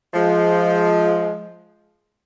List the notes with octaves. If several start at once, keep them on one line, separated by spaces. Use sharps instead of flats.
F3 G#3